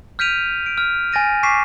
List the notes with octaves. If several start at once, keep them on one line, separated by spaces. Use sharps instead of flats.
F6 G6 B6 D7 D#7 F7
D7
F6
G#5 A6 A#6 D#7
G#5 C#6 D6 B6 C7 E7